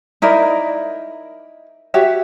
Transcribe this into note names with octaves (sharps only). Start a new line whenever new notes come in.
D#4 E4 A#4 D5
F#4 G4 C#5 E5